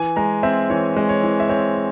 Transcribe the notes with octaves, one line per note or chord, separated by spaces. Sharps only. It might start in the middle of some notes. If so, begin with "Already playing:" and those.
Already playing: E3 G#5
G#3 A#5
C4 E5
E3 C#5
G#3
C#5
E3
E5
C4 C#5